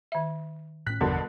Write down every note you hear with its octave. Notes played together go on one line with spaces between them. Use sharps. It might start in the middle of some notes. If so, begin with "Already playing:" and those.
D#3 E5
A2 C#4 F#6 B6
G1 E2 G2 B2 D3 F3 A#4